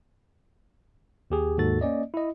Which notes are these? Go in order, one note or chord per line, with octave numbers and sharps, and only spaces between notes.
D#2 G4 G#4
D#2 G#2 F#4 A4 A6
A#3 C#4 D5 D#5
E4 D#5